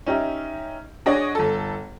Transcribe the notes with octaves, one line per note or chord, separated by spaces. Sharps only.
C#4 D#4 G4 E5
D4 F#4 G#4 C#5 D#5
G1 A4